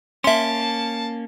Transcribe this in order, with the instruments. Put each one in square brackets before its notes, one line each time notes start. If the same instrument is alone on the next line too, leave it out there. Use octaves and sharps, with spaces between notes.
[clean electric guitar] A#3 C#4 [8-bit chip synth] E5 C6 [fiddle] A5